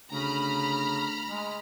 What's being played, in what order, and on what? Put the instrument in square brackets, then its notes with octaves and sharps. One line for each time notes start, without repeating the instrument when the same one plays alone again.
[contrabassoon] D2 [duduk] C#3 [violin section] A#5 B5 F6
[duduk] G#3